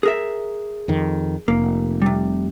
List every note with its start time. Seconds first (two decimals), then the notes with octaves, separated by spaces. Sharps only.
0.03 G#4 A#4 E5
0.88 F2 D#3
1.48 F1 A#3
2.02 C3 G3